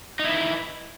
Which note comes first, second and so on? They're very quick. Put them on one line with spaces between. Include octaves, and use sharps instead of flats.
D#4 E4 B4